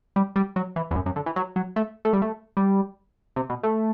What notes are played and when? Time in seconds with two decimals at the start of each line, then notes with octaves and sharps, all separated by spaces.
0.16 G3
0.36 G3
0.56 F#3
0.76 E3
0.91 E2
0.96 F#2
1.06 F#2
1.16 D3
1.26 E3
1.36 F#3
1.56 F#3
1.76 A3
2.05 A3
2.13 G3
2.22 A3
2.57 G3
3.36 C3
3.50 B2
3.63 A3